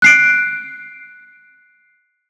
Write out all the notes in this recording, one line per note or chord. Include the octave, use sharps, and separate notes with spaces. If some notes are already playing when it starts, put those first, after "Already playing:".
F#6 C7 D7